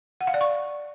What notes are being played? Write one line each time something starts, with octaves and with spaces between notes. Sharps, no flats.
F#5
F5
D5
C#6